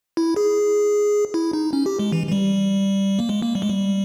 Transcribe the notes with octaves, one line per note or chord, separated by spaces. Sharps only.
E4
G#4
E4
D#4
C#4
G4
G#3
E3
E3
G3
A#3
G#3
A#3
G3
G#3
G3